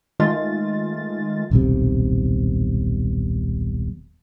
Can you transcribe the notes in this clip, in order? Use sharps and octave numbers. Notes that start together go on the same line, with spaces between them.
D#3 G#3 A3 F4 A6
D#1 B1 C3